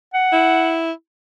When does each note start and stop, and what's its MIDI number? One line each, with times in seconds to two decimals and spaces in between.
0.14 0.83 78
0.33 0.92 64